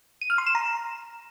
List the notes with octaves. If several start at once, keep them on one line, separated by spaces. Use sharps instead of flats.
D#7
F6
C6
E7
A#5